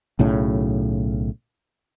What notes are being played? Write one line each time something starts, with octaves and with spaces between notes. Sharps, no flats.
B1 A2 C#3